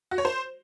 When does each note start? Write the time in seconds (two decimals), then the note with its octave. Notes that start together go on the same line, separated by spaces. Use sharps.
0.11 F#4
0.18 C#5
0.25 C5